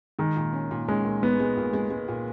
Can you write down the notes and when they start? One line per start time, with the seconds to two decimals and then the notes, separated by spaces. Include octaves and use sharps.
0.19 D#3 G#3
0.36 A#2
0.53 C#4
0.71 A#2
0.88 G#3 C#4
1.04 A#2
1.23 G#3 B3
1.39 G#3
1.57 A#2
1.73 G#3
1.90 G#3
2.08 A#2